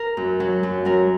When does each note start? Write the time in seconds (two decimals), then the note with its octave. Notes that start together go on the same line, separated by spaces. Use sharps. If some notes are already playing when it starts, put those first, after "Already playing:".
Already playing: A#4
0.17 F#2
0.40 F#3
0.63 F#2
0.85 F#3 A#4